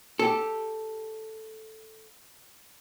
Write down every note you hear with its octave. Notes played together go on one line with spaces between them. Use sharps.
G4 A4